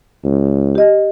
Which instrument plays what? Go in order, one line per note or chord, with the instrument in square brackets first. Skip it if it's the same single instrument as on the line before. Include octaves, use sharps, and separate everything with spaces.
[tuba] C#2
[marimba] G4 D#5